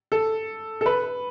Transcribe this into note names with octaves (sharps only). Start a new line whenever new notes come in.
A4
A4
B4